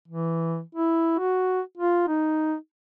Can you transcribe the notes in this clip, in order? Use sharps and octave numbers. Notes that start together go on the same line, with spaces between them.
E3
E4
F#4
F4
D#4